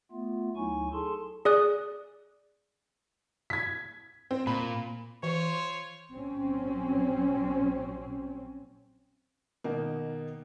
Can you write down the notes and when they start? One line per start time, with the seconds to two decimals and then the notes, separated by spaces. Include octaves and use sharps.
0.11 A3 B3 F4
0.56 D2 F#3 D#4 E4 G#5 C#6
0.93 G#4 A4 A5 C6
1.45 G#4 D5 D#6 F#6
3.50 G#6 B6
4.31 C4
4.47 A#2 B5
5.23 E3 F4 C5 C#5
6.11 A#1 F#3 C4 C#4
9.64 B2 D#3 A#3